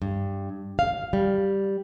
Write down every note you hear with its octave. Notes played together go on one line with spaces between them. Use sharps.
G2
F5
G3